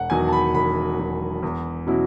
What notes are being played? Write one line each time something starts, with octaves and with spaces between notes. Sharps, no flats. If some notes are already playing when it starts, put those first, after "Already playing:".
Already playing: E1 F#5
E2 D#3 F#3 G#5
A5
B5
E1 B5
E2 D#3 F#3
E2
B2 F#3 C#4 E4